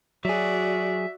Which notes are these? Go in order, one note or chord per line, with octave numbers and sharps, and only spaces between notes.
F#3 F#4 G#4 D5 E5